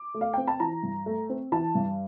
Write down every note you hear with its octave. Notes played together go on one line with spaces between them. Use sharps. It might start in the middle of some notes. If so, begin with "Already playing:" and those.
Already playing: D6
A3
F5
C4 G5
A5
E3 A#5
G2
A3
C4
E3 A5
G2